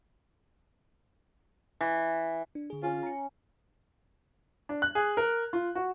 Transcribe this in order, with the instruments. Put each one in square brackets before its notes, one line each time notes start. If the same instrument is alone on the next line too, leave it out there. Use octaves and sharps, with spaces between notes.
[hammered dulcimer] E3
[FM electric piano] D4
D3 G#4
[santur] C#4 [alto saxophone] F4
[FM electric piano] A#5 C#7
[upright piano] D4
F#6
G#4
A#4
F4
F#4